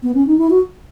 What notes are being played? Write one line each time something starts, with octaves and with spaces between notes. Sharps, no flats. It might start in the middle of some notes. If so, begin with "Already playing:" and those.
B3
C#4
D#4
E4
F#4